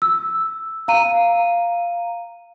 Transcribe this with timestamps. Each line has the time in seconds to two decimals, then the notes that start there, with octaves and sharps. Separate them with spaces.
0.02 E6
0.88 F5 A#5 D#7